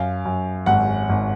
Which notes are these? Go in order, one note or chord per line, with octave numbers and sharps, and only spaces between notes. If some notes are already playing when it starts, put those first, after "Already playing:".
Already playing: F#2 F5
F#2
G#1 F#5
G#1